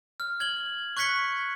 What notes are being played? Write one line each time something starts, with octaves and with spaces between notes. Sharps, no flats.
F6
G#6 F#7 G7
C#6 F#6 G#6 B6 C#7 G7